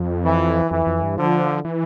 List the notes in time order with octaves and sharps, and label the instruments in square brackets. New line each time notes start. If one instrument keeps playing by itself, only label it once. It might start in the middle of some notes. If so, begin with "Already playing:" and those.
Already playing: [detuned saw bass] F2
[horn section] E3
[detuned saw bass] F2 [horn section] E3
[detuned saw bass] F2
G2
[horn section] D3 [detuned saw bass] F3
[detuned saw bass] E3